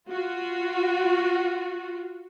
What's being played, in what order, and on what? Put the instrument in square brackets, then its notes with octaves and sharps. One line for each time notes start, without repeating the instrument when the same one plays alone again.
[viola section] F4 F#4